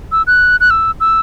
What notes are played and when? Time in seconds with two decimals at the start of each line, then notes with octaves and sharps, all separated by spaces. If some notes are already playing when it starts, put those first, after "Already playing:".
0.12 E6
0.27 F#6
0.60 F#6
0.70 E6
1.00 E6